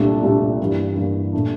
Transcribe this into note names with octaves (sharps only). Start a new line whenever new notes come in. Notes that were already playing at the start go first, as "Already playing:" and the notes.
Already playing: C2 A#2 A3 D4
C2 A#2 A3 D4
G2 E3 A#3
G2 E3 A#3
A#2 A3 D4